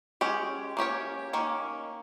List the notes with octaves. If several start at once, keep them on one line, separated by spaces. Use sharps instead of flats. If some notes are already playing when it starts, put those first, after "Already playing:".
G#3 C#4 G4
A#3 C#4 G4 C#5
D#3 A#3 C#4